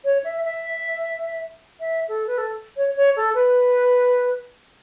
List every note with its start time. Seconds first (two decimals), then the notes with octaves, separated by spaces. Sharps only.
0.04 C#5
0.24 E5
0.44 E5
1.79 E5
2.08 A4
2.26 B4
2.37 A4
2.77 C#5
2.96 C#5
3.16 A4
3.34 B4